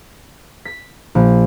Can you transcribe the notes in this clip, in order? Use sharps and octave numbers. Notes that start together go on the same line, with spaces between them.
B6
A#1